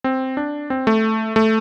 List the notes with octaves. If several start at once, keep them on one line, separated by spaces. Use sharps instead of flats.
C4
D4
C4
A3
A3